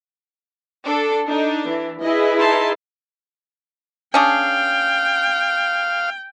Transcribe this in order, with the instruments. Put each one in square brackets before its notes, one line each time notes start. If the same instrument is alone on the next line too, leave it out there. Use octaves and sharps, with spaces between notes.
[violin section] D4 A4
[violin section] D4 [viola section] D#4
[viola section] E3
[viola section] E4 G#4 B4 [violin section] D#5
[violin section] D#4 A5 C6
[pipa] C#4 D4 G#4 [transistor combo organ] F5 [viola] G5